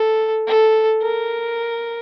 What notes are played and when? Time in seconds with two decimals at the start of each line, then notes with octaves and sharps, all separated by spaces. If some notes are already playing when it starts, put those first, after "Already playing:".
Already playing: A4
0.47 A4
1.03 A#4